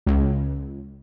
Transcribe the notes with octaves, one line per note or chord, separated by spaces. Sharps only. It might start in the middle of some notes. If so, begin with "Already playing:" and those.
C#2